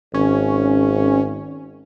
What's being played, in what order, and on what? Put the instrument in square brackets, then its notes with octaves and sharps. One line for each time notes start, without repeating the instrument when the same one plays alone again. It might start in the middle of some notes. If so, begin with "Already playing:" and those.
[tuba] G#1 [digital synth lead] C#4